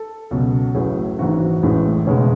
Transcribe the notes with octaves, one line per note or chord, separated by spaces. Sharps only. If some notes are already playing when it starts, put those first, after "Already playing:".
Already playing: A4
C#2 B2 F#3
A1 A2 F#3 G#4
G#1 G#2 E3 F#4
A1 A2 E3 G#3
E1 E2 C#3 G#3 C#4